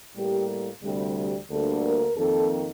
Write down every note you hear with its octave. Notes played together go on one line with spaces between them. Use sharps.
A2 G3 A#3 G4
D2 C3 G3
D2 D3 G3 A#3 A4
A#4
F2 D#3 A#3 A4